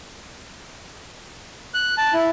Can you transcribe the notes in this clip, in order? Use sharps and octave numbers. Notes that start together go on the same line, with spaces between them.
F#6
A5
E4